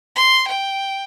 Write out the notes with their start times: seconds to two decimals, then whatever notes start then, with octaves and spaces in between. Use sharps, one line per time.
0.15 C6
0.47 G5